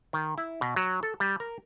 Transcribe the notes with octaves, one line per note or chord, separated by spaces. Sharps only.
D#3
E4
B2
F#3
A4
G3
A#4